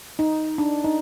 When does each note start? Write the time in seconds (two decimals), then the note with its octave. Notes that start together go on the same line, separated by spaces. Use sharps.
0.19 D#4
0.58 D4
0.84 D#4